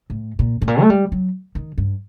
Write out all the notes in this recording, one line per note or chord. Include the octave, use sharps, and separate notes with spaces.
A2
A#2
A2
A#2
A3
G3
F#3
D#3
G2